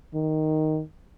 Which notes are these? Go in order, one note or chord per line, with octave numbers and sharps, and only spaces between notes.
D#3